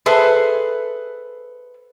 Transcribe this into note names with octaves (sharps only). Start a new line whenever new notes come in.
G#4 A4 B4 C5 E5 G#5